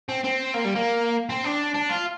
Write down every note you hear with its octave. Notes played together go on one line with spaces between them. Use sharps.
C4
C4
A#3
G3
A#3
C4
D4
D4
F4